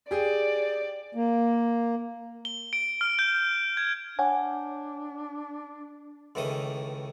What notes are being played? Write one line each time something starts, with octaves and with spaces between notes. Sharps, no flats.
G4 G#4 D5
A#3
G7
D7
F6
G6
G#6
D4 C#5 F#5 G#5
C#2 A2 D#3 E3 D#6